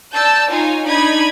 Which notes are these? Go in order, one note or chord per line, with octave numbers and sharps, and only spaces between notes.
D5 A5 E6 G6
D#4 F4 C#5 G#5
D4 D#4 B5 D#6 G#6